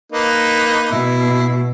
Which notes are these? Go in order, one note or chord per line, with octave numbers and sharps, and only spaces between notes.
A#3 D#4 B4
B2 E4